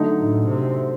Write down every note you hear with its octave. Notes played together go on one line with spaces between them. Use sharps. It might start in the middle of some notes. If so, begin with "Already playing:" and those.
Already playing: D3 F#3 A3 D#4
A2
C3